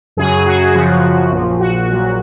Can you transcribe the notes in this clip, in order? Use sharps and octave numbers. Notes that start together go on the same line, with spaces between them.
F#2 C#3 F#3 G#4
F#4
F#2 C#3 F3
A#1 A#2 F3
F#4
A#1 A#2 F#3